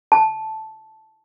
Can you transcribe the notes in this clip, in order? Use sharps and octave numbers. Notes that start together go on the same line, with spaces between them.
A5